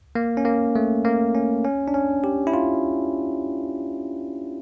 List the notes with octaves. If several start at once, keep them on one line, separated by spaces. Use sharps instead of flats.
A#3
C#4
A#3
A3
A#3
C#4
C#4
D4
C#4
G4
E4
F4